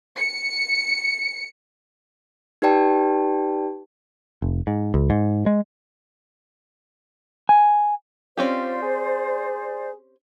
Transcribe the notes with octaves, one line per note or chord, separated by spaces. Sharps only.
C#7
D#4 G4 B4 D5 G5 A5
F1
G#2
C#2
G#2
G#3
G#5
C4 C#4 F4 G4 C5 D5
G#4